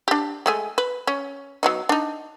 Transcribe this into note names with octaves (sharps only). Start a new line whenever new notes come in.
D4 G4
G#3 A3 G#5
B4
C#4
F#3 B3 D#4
D4 D#4